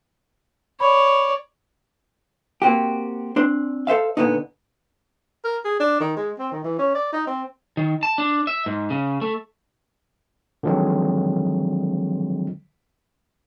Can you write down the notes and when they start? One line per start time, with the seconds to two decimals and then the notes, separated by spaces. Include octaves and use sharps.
0.80 C#5 D5 B5
2.62 A#3 C4 F#4 G4
3.36 C4 D4 C5
3.87 A4 C5 E5 F5
4.17 A#2 D3 B3 D4 D#4
5.44 A#4
5.65 G#4
5.80 D4
6.00 D#3
6.17 G#3
6.39 C4
6.52 D#3
6.64 E3
6.79 C#4
6.95 D5
7.13 D#4
7.27 C4
7.77 D#3
8.03 A5
8.18 D4
8.47 E5
8.66 G#2
8.90 C#3
9.22 A3
10.63 D3 D#3 F3 F#3 G#3 C4